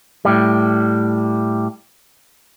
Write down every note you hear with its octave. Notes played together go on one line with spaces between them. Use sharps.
A2 G3